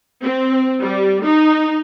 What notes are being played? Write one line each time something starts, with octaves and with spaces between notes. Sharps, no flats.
C4
G3
D#4